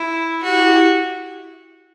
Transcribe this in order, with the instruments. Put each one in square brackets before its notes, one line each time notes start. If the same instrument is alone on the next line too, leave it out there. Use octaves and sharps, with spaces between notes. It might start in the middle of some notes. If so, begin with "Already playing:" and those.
Already playing: [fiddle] E4
[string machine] E4 G4 [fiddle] F#4